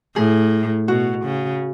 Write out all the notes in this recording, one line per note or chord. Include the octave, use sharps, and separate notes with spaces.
A2 G#4
B2 F#4
C#3